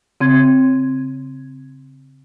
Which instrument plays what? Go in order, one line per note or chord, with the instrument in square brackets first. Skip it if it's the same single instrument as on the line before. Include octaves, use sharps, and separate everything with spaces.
[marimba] C#3 C4 G#6